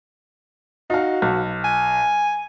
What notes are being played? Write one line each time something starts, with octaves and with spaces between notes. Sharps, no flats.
D#4 F#4 F5
B1
G#5